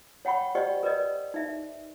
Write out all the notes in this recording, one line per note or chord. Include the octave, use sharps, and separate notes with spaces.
C#5 F#5 G5 B5 C#6
G4 C5 D5 D#5 G5 C#6
A#4 B4 D5 D#5
D#4 E5